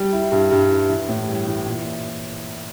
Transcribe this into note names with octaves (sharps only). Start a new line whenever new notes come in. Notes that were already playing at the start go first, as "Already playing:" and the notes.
Already playing: G3
E4
G2
G2
E4
E3
A2
G3
E3
A#2